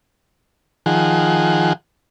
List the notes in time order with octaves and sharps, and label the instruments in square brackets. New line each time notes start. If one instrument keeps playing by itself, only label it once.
[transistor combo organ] D#3 F3 G#4 F#5